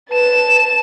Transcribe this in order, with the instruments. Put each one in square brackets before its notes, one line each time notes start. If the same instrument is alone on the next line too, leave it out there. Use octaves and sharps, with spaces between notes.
[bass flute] B4 [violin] A5 E7